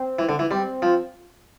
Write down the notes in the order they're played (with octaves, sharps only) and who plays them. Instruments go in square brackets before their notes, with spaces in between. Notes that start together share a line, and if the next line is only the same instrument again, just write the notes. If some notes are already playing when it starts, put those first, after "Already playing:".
Already playing: [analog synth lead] C4
[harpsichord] E3
D3
E3
[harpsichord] G3 [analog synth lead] C4
[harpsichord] F3